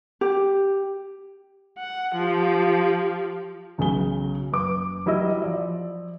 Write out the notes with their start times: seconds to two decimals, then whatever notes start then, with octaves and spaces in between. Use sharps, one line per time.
0.21 G4
1.78 F#5
2.15 F3 G4
3.78 B1 C#3 F#3 G#4 G7
4.51 F#1 B4 D6
5.06 F#3 G3 E4 D#5 E6
5.42 F3 D5